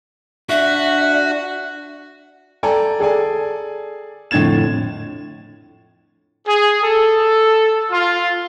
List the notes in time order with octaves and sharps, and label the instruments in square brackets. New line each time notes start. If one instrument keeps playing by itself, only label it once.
[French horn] D4 [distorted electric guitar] F#4 [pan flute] E5
[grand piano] A4 D5 G5 G#5 A#5
G#4 A4 D5 G#5
F2 A2 D3 G#6 A6 E7
[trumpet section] G#4
A4
F4